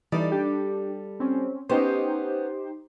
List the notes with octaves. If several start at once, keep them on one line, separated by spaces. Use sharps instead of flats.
E3 G3 D#4 A4 D5
D4 G4
C4 C#4
B3 C#4 D#4 G4 C5